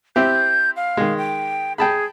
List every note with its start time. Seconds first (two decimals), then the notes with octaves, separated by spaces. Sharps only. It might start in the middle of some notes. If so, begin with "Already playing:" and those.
0.16 C4 E4 G4 G6
0.76 F5
0.97 D#3 G#3
1.18 G5
1.78 G#4 G5 A5 B5